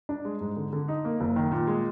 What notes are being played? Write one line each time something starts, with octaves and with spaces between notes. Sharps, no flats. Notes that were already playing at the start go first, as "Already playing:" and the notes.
D4
G#3
G#2
D3
D3
D#4
A#3
F#1
D#3
A#2
G#3